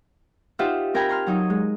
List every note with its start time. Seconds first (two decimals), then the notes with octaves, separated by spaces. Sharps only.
0.59 D#4 F4 G4 C5 E5 F#5
0.94 C4 A#4 G5 G#5 A#5 B5
1.09 A#5 C6 F6
1.27 F#3 D#4 D#6
1.50 G#3